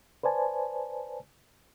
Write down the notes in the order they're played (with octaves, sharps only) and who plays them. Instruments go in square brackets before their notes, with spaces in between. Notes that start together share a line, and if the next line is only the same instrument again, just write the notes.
[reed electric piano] B4 C5 D5 G#5 A5